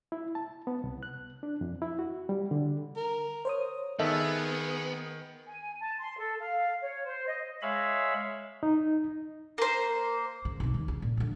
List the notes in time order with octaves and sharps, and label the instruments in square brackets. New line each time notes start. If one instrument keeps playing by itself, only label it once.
[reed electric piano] E4
A5
B3
C2
F#6
D4
F2
E4
F#4
G3
D3
[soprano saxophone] A#4
[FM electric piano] C5 C#5 D#6
[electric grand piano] D#3 [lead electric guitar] B3 [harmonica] G#4 [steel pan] A4 D#5 E5
[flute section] G#5
A5
C6
A4
F5
C#5
C5
D#5
[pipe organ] G#3 C#5 E5 F5 B5
[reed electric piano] D#4
[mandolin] A#3 C5
[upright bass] C#3
B1 C3
D#2
C#3
A#2
D3 F#3